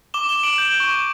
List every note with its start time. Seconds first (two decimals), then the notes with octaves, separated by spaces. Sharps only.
0.14 D6 E7 G7
0.29 E7 G7
0.36 D6
0.43 D7 F#7
0.58 G6 D7 F#7
0.80 C#6